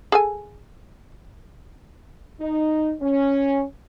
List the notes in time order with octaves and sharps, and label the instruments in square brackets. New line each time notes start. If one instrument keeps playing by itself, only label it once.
[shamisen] G#4 A4 G#5
[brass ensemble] D#4
C#4